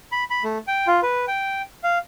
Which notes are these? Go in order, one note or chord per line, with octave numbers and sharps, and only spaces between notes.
B5
B5
A3
G5
F4
B4
G5
F5